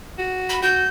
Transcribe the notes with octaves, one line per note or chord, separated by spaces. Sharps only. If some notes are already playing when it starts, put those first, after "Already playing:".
F#4
B5
F#4 G6